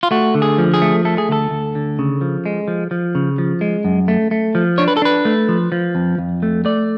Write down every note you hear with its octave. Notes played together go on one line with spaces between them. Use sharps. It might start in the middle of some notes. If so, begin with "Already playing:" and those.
F4
A3 F#4
D3
G#4
F3
G#4
A3
A3 A4
G#4
D2 A4
D2
D3
C#3
F3
G#3
F3
F3
C#3
F3
G#3
F#2
A3
A3
F3
D4 C#5
B4
A4
D4 B4
A3
F3
F3
F2
F2
A3
A3 D5